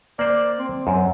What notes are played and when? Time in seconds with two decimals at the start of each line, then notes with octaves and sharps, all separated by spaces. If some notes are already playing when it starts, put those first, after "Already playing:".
0.19 A#3 C5 D5
0.59 C4
0.87 F#2